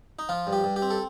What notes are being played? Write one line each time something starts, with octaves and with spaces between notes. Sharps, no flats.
D#4
F3 F4
G2
G4
G2
G4
C4
A4